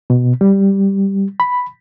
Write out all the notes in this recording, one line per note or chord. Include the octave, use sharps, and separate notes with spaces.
B2
G3
B5